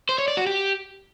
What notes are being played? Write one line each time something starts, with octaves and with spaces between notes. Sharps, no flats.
C5
C#5
D5
F#4
G4